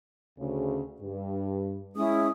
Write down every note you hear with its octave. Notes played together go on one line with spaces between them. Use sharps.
D2 C#3 C#4
G2
G#3 C#4 E4 D#6